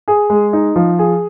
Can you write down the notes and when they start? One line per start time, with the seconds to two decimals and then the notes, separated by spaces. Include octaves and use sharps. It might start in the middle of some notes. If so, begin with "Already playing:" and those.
0.08 G#4
0.30 G#3
0.53 D#4
0.76 F3
0.99 G#4